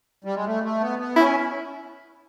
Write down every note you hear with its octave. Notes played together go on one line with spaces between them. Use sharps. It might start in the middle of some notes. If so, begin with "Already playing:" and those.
G3
G#3
A3
A3
B3
B3
C#4 E4